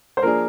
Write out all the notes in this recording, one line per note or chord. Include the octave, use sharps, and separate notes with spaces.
C5
F3 A#3 D4 G#4 A#4